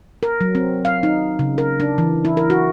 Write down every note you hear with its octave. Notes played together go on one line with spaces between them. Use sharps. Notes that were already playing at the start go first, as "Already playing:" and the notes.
A#4
F#3
C4
F5
D#4
C#3
A#4
D4
E3
E4
A#4
F#4